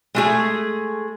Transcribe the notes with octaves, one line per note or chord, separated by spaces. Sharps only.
G#3 A3 G#4